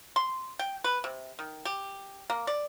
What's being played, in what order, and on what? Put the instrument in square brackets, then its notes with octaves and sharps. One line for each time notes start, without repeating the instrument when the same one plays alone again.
[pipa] C6
G5
B4
C3
D#3
G4
A#3
D5